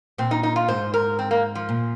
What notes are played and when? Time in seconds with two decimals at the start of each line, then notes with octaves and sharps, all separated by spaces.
0.18 A#2 C4
0.31 D#4
0.43 D#4
0.56 F4
0.68 G#2 C5
0.94 A#4
1.19 C4
1.31 A#3
1.55 F3
1.69 A#2